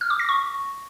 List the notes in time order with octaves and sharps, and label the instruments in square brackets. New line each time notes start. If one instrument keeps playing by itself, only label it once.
[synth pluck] F6
D6
A#6
C#6